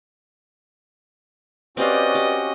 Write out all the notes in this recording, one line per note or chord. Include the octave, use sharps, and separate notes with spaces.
C4 C#4 F#4 G4 B4 D5 D#5 F5
G4